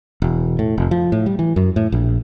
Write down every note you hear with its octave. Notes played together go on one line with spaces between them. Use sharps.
E1
A2
F1
F3
A2
G3
E3
F#2
A2
A#1